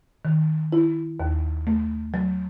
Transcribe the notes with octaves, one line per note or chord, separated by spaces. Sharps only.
D#3
E4
D#2
A3
F#3